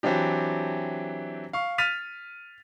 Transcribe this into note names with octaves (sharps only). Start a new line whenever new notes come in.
E3 F#3 C4 D4 G4
F5 C#6
F6 A6 B6 D#7 F7